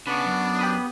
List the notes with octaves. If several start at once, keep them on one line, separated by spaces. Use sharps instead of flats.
C#3 B3 D4 B5 C#6
F#2
G4 B5 D#6